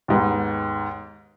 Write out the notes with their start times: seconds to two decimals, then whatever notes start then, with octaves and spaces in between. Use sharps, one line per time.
0.08 D#2 G#2 B3